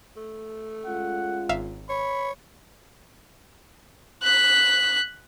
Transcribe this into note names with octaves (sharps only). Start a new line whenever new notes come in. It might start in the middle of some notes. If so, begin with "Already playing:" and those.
A3
G#3 C#4 F4 F#5
G#1 E5 F5
C#5 B5
F#6 B6